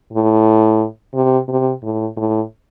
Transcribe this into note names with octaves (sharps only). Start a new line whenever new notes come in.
A2
C3
C3
A2
A2